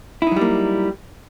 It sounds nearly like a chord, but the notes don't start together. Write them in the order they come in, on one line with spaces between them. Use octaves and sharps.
E4 D#4 F#3 G3 A#3